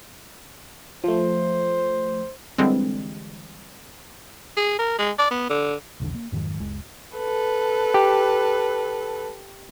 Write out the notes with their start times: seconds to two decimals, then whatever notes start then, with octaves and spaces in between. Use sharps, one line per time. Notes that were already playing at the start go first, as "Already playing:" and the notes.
1.04 F3 A3 C5
2.58 D3 E3 G3 G#3 C4
4.57 G#4
4.79 A#4
4.98 G#3
5.18 D5
5.31 B3
5.49 D3
6.00 F1 B1 E2 D3
6.15 A#3
6.32 F2 G#2 D#3 F#3
6.59 F#1 C#2 G#3
7.17 A4 B4
7.94 G4